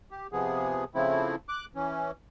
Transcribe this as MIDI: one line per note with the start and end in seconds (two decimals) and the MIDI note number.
0.11 0.27 67
0.32 0.84 48
0.32 0.84 53
0.32 0.84 59
0.32 0.84 68
0.95 1.35 49
0.95 1.35 53
0.95 1.35 57
0.95 1.35 60
0.95 1.35 64
1.49 1.65 86
1.49 1.65 90
1.75 2.11 52
1.75 2.11 61